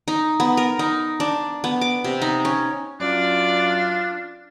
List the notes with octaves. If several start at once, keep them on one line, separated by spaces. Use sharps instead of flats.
D#4
B3
A#4
D#4
D4
B3
D6
C3
D#4
C#4
F#2 D4 F4 D5